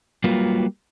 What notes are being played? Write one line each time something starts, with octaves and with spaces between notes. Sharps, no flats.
F#3 G3 A#3 F4 B4